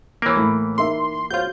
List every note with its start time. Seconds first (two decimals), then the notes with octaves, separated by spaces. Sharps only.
0.22 E3 A#3 C#5 D7
0.36 A2 A3 B5
0.78 D#4 A#4 E5 C6
1.31 F4 F#4 C5 C#5 G6